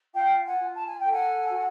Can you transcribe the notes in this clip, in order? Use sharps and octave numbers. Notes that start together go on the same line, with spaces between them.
F4 F5 G5
F#5 G#5
F4
A5
G#5
A4 G5
F#5 G#5
F#4